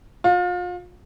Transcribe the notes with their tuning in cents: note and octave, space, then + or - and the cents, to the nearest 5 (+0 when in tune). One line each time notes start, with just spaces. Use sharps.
F4 +35